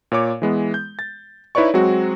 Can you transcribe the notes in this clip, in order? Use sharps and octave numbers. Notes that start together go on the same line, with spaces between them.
A#2 C#5 D6
E3 G#3 B3
G6
A6
D#4 E4 B4 C#5 D5 C#6
F#3 G#3 C4 F#4